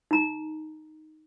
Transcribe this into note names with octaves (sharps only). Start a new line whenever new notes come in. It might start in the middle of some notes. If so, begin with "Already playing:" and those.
D#4 A#5